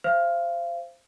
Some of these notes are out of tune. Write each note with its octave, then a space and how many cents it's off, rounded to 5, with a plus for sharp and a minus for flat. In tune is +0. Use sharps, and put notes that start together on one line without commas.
C5 +0 F5 -30